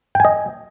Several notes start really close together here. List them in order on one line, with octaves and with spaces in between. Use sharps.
G5 G#5 D#5